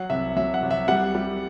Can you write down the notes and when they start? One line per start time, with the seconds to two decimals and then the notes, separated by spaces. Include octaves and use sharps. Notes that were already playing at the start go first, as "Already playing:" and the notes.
Already playing: F#3 F#5
0.10 C2 E5
0.36 F#3 E5
0.54 F#5
0.63 C2
0.71 E5
0.88 G3 F#5
1.15 G3